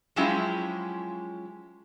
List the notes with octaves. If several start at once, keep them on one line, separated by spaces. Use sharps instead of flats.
F3 F#3 G#3 C#4 E4 G4